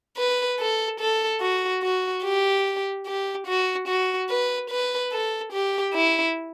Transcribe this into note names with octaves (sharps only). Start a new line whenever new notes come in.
B4
A4
A4
F#4
F#4
G4
G4
F#4
F#4
B4
B4
A4
G4
E4